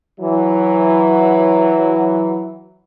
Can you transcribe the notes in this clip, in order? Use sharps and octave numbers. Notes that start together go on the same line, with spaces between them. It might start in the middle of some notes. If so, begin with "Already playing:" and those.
E3 F#3